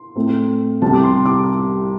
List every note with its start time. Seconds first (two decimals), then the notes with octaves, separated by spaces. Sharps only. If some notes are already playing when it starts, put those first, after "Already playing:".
Already playing: C6
0.16 A2 A3 C4
0.82 C2 C3 G3 C4 A5
0.93 D6
1.03 C6
1.26 D6